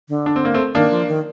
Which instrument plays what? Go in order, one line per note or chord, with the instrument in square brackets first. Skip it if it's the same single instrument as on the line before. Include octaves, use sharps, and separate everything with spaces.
[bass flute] D3
[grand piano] D4
C4
A#3
A3 C4
[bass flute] D#3 [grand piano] A#3 D4
[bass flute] F3
D#3